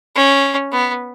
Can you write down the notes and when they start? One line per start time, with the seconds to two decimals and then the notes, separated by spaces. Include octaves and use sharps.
0.15 C#4
0.72 B3